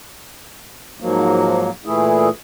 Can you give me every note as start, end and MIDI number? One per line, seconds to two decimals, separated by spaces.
1.01 1.70 44
1.01 1.70 53
1.01 1.70 54
1.01 1.70 58
1.85 2.29 46
1.85 2.29 52
1.85 2.29 57
1.85 2.29 64
1.85 2.29 68